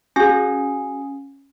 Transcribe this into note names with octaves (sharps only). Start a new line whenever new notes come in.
C#4 F#4 G#4 G#5